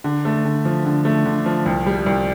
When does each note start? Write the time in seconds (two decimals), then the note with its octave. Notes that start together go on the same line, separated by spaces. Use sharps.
0.04 D3
0.25 A3
0.45 D3
0.65 F3
0.85 D3
1.05 A3
1.25 D3
1.46 F3
1.66 C2
1.86 G3
2.06 C2